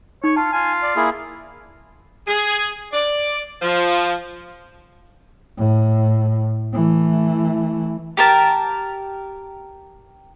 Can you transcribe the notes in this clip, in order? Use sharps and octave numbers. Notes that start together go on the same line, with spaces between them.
D#4 C#5
F4 A5
F4 G#5
D5
A#3 E4 G#4
G#4
D5
F3
A2
E3 A3
G4 A#4 A5